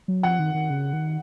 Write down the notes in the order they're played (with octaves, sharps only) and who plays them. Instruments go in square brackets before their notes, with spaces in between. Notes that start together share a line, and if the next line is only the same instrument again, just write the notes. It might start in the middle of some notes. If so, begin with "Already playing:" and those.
[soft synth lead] F#3
[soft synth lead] F3 [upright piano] F#5
[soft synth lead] D#3
D#3
C#3
D#3